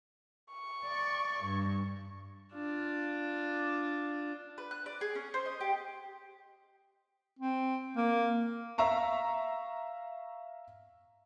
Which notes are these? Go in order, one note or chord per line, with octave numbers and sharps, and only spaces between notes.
C#6
D5
G2
D4 F4
B4
F#6
D5
G#4
C#4
C5
D#5
G4
C4
A#3
E5 F5 A#5 C#6